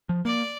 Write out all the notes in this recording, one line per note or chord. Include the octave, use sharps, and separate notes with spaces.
F3
A#3 D5